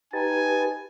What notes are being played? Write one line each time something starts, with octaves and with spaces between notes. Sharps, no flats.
D#4 G4 B4 G#5 A5